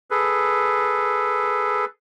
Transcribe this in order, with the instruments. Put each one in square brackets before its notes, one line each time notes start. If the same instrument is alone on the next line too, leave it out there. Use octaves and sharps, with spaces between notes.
[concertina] G#4 A4 B4